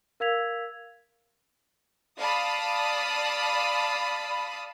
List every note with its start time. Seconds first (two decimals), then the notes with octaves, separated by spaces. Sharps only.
0.20 A#4 F5 E6 G#6 B6 F7
2.19 D5 F5 A5 B5 D#6